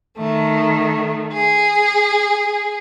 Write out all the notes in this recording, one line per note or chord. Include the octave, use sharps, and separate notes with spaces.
D#3 A3
G#4